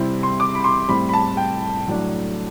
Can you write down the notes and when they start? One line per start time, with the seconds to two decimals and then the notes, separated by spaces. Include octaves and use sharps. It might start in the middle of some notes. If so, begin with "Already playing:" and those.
Already playing: C3 G3 C4 E4
0.23 C6
0.40 D6
0.55 B5
0.64 C6
0.88 A2 G3 C4 E4 B5
1.09 B5
1.14 A5
1.37 G5
1.87 A2 F#3 A3 D4